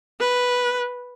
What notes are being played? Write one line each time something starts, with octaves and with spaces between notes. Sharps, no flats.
B4